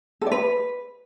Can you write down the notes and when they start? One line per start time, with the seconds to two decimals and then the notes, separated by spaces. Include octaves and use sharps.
0.21 A4
0.26 D5
0.32 B4